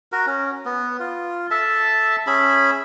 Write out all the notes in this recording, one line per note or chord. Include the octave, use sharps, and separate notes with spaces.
F#4 A#4
C#4
B3
F4
A4 E5 A5
C#4 G#4 E5 B5